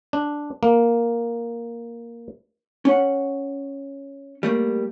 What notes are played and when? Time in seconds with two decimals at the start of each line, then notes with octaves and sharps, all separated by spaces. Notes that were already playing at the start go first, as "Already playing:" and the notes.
0.13 D4
0.63 A#3
2.85 C#4 F#5
4.43 G3 A3 A#3